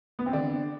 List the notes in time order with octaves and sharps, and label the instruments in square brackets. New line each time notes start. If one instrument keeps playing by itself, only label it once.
[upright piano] B3
C4
D3 D4